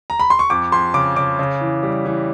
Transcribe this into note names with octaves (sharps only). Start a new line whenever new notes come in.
A#5
B5
C6
C#6
F2 D6
F2 C6
C#3 D6
C#3 D6
C#3
E3
G3
E3